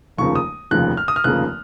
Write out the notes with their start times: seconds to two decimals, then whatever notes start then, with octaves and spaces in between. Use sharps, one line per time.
0.17 F1 D#2 C#3 F3 A#3 C#6
0.35 D#6
0.71 F1 D#2 C#3 F3 A#3 F#6
0.97 F6
1.08 D#6
1.16 F6
1.24 F1 D#2 C#3 F3 A#3 F#6